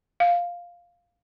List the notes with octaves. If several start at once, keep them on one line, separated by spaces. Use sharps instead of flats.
F5